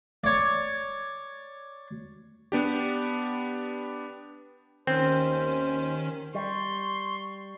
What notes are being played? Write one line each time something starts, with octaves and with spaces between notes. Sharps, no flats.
C#5 D5
B3 D4 G4
D#2 D#3 C4 C#4 C5
G3 C6 C#6